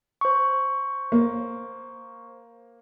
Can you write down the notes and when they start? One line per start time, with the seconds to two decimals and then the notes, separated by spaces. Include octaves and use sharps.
0.21 C5 C#6
1.12 A#3